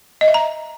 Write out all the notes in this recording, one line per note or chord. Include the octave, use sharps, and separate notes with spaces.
D#5
E5
A#5